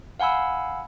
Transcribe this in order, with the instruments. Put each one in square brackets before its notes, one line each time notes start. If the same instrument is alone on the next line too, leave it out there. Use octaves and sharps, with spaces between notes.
[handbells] F5 F#5 G#5 B5 E6